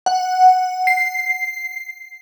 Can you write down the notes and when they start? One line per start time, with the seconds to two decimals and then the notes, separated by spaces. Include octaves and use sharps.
0.06 F#5
0.87 C7